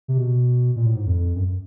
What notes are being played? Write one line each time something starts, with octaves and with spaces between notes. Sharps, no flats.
C3
B2
A#2
A2
G#2
F2
F#2